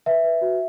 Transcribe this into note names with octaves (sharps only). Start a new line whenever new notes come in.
B4 E5
B4
F#4